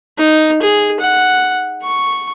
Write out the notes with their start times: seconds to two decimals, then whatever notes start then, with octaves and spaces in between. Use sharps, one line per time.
0.18 D#4
0.62 G#4
1.00 F#5
1.83 C#6